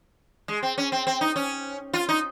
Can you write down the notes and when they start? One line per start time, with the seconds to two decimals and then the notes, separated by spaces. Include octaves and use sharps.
0.48 G#3
0.63 C4
0.78 C#4
0.92 C4
1.07 C4
1.21 D#4
1.36 C#4
1.93 F4
2.09 D#4